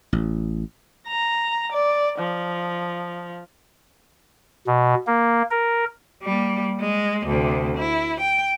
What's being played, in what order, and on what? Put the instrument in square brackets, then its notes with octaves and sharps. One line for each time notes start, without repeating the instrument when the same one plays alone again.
[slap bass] A1
[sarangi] A#5
D5
F3
[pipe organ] B2
A#3
A#4
[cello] G3 A#3
G#3
D2 C3
E4
G5